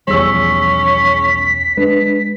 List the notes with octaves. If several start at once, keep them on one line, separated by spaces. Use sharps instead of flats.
B1 E2 F3 G3 C#4 G#4 E6 B6
G#3 D4 B4